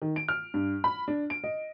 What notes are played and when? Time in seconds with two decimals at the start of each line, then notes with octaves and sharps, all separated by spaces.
0.02 D#3
0.16 D7
0.28 F6
0.54 G2
0.84 B5
1.08 D4
1.30 D7
1.44 D#5